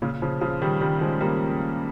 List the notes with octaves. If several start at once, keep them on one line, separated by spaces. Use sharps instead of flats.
A#2 C#3
C#3 F3
C#3 F3
D#3 G3
D#3 G3
F3 G#3
G3 A#3